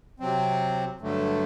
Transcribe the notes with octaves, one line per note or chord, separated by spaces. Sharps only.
C3 F#3 C4
G2 D3 F#3 A3